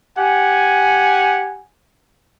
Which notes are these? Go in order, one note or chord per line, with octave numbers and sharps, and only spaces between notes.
G4 F#5 G#5